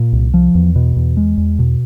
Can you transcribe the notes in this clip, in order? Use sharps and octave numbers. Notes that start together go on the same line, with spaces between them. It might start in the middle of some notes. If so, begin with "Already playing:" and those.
Already playing: A#2
C2
F3
E2
B2
E2
G#3
E2
B2